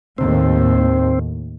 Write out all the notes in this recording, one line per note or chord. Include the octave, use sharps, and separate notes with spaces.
D#2 A2 C4